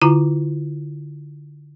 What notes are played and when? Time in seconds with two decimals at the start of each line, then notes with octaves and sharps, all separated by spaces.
0.02 D3 E4 F4 A#5